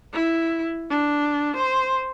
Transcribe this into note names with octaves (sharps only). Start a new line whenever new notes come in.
E4
D4
C5